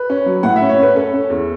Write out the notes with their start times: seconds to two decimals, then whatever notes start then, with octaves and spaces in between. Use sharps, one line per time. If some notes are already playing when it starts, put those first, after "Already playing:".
Already playing: B4
0.10 C#4
0.26 F#3
0.43 A2 F#5
0.56 E5
0.62 C#4
0.69 C#5
0.79 C#4 B4
0.96 C#4 A4
1.13 C#4
1.30 E2